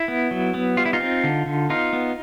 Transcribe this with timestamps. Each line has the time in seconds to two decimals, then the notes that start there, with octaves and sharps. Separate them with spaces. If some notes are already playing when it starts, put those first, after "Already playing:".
Already playing: E4
0.08 B3
0.31 F#3
0.54 B3
0.77 G3 F4
0.85 E4
0.93 D#4 F4
1.00 C4
1.24 D3
1.46 D3
1.69 B3 D#4 F4
1.93 B3